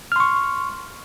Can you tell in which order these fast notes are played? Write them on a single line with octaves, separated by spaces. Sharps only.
F6 C6 C#6